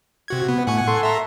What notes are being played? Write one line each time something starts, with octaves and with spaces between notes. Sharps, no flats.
C3 F#4 G#6
B3
A2 F#5 G#5 C#6
A4 C6
E5 A#5